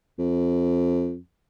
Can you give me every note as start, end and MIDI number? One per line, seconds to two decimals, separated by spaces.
0.19 1.17 41